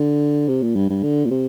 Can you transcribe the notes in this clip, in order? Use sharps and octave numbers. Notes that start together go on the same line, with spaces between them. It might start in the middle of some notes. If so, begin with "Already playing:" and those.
Already playing: D3
C3
A#2
G2
G2
D3
A#2
C3